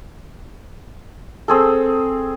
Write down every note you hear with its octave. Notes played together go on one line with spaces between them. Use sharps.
C4 G#4 A4